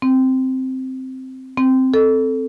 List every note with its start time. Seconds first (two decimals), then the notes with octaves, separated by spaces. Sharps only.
0.02 C4
1.57 C4
1.94 A4